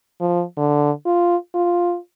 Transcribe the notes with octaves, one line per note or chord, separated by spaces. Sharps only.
F3
D3
F4
F4